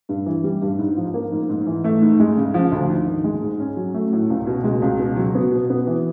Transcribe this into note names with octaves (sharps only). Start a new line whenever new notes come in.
G2
E3
G3
G2
G#2
F3
A#3
G#2
G#2
E3
A3
G#2
G#3
C#3
F3
D2
G#2
D#3
G#3
G#2
C#4
F#3
A3
A2
C#2
B2
G#3
C#2
B2
F#3
B3
B2
B3
E3